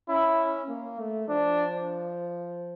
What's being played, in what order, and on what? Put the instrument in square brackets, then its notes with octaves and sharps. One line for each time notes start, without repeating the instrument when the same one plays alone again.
[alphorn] C#4 [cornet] E4
[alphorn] A#3
A3
[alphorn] F3 [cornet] D4